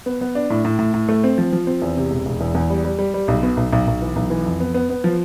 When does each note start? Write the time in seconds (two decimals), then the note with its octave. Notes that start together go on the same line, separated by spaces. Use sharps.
0.06 B3
0.21 B3
0.35 D4
0.50 A2
0.65 A2
0.79 A2
0.94 A2
1.09 A3
1.24 C4
1.38 F3
1.53 F3
1.67 C4
1.82 E2
1.97 C3
2.11 E1
2.26 E1
2.40 E2
2.55 E2
2.70 G3
2.85 G3
2.99 G3
3.14 G3
3.28 B1
3.43 B2
3.57 B1
3.72 B1
3.87 B1
4.02 E3
4.16 B1
4.30 E3
4.46 F2
4.60 B3
4.74 B3
4.90 B3
5.04 F3